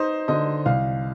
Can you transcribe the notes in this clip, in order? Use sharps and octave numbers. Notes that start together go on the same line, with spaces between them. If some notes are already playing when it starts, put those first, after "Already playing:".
Already playing: D#4 C5
D3 D#5
C2 F5